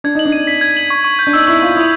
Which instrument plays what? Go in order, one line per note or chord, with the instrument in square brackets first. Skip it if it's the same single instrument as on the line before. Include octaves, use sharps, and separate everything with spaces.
[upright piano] D4 [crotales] G#6
[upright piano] D#4 [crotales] F#7
[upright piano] D4
[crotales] D#7
B6
G#6
F#7
C#6
C#6
G6
[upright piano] D4
[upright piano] D#4 [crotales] E6
[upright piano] E4 [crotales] C#6
[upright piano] F4 [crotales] C#6
[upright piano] E4 [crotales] D#6